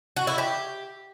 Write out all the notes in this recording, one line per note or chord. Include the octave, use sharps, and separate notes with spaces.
F#4
E4
G4